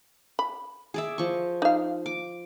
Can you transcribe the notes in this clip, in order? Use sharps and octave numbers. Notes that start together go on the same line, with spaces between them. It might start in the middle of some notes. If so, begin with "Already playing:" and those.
B5
G#4 D5 E5
F3 C#6
D#4 F5
D6